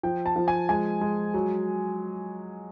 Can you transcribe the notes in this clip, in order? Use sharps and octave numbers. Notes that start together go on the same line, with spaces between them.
F3 G5
A5
F3
G#5
G#3 G#5
G#3
F#3